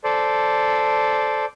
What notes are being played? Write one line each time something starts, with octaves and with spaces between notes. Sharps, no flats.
A4 C5 D5